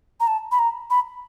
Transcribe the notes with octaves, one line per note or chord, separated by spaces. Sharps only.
A#5
A5
B5
A#5
B5